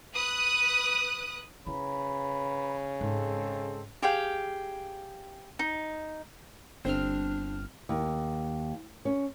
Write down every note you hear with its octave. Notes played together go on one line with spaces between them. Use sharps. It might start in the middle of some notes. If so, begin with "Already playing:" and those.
B4 D#6 F#6
C#3 E4 B4 A#5 B5
G#2 G#3 C4 A4
G4 G#4 F5 G5
D#4
G1 C4 D4 F6
D#2
C#4